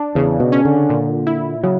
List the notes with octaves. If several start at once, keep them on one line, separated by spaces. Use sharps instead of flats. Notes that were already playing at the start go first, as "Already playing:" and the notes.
Already playing: D4
E2 C#3
B2
C#4
D3
A#2
E4
C#3 F#3